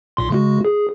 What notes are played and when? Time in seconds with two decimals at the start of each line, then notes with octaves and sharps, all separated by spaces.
0.17 B1 A#2 C6
0.30 C#3 G#3 F#4
0.65 G#4